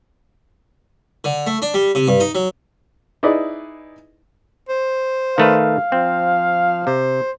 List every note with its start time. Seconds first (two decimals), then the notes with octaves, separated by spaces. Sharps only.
1.24 D3
1.47 A3
1.62 D4
1.74 G3
1.95 C3
2.08 G2
2.20 D#4
2.35 F#3
3.23 D#4 E4 G#4 B4 D5 D#5
4.69 C5
5.38 D#3 A3 B4 F5
5.92 F3 C4
6.87 C3 C5